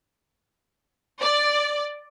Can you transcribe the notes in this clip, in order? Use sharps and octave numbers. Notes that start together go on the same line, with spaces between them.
D5